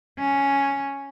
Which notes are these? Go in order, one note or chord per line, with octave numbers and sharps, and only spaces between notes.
C#4